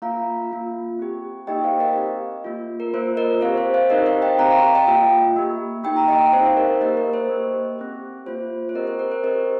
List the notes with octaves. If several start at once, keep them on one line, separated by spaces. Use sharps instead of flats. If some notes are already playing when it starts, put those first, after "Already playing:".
A#3 F4 F5 A#5
A#3 F4
C4 G4
A#3 D#4 G4 D#5 G5
C5 F5
A#4 D#5
C4 G4
A#3 F4
A#4
A#3 F4 C5
A#4 D#5
C4 G4 C5 F5
C5
C5 F5
C4 D#4 G4 A#4 D#5
C5 F5
D#5 G5
C4 G4 F5 A#5
F5 A#5
D#5 G5
A#3 F4
A#3 G4
A#3 D#4 G4 G5
A#5
D#5 G5
C4 D#4 G4 C5
C5 F5
A#4 D#5
A#3 G4 A#4 D#5
A#4 D#5
C5
A#3 G4
C4 G4
A#3 F4 C5
C5
C4 G4 A#4 D#5
C5
A#4
C5
C4 G4 A#4 D#5